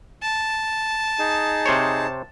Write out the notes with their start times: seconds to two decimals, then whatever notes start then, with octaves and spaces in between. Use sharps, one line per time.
0.22 A5
1.19 D#4 G#4
1.66 C3 C5 C#5